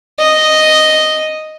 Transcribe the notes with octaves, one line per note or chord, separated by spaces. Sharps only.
D#5